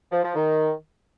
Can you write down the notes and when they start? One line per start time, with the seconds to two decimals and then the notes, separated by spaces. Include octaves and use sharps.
0.12 F3
0.24 F3
0.36 D#3